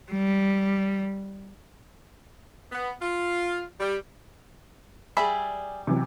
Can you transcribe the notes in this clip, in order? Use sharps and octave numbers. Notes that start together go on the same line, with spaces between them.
G3
B3
F4
G3
G3 G#4 D5 E5 G#5 B5
C3 E3 F#3